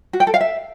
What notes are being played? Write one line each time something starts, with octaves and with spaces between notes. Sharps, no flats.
F#4
G5
A4
F5
E5